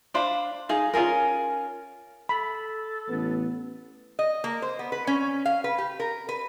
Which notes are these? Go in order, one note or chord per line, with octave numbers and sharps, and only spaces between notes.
D4 C5 F5 B5
D#4 G#4 F5
C#4 F4 G#4 A#4
A4 B5
A1 B3
D#5
A#3
C5
B3
B4
C#4
F5
B4
G4
A#4
B4